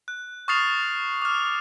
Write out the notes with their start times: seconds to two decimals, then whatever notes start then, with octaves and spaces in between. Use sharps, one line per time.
0.08 F#6
0.48 C#6 D#6 F6 A6 C7 F7
1.22 D6 F6